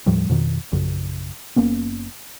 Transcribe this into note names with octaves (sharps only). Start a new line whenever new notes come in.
D#2 A2 F3 G3
F2 B2 D#3
A#1 F#2 C#3
F#1 A#3 B3 C#4